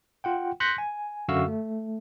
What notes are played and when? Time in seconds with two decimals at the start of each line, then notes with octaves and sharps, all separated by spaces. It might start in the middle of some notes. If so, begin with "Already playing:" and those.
0.24 F4 F#5 G5
0.60 C6 F#6 G6 A#6 B6 C#7
0.78 G#5
1.28 F#2 D3 F#4 E5 F5 E6
1.48 A3